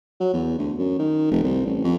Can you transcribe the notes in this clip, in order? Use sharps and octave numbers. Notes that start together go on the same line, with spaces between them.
F#3
E2
D2
F#2
D#3
F1
C2
A1
F2